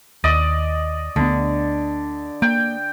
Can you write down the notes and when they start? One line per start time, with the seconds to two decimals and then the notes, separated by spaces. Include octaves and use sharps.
0.24 D#2 D5 D#5
1.16 D2 D3 B3
2.42 A#3 G5